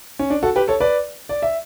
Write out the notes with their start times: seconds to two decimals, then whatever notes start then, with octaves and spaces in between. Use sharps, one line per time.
0.19 C#4
0.30 D4
0.43 F#4 A4
0.56 G4 B4
0.68 A4 C#5
0.80 B4 D5
1.29 D5
1.42 E5